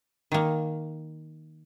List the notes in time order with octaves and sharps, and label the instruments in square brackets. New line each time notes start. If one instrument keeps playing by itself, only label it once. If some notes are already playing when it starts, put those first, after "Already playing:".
[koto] D#3 A#3